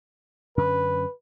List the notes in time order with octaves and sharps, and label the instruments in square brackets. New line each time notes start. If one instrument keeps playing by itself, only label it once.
[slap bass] F#2 D3 C#4 [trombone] B4